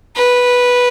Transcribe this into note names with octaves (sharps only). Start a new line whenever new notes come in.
B4